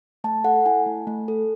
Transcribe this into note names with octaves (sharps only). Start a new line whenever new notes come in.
A3 A5
A4 F#5
E4 G#5
A3
A3
A4